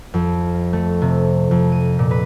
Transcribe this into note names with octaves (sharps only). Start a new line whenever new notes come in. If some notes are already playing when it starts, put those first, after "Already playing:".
F2
A3
C3
F2
D#7
A#2
B4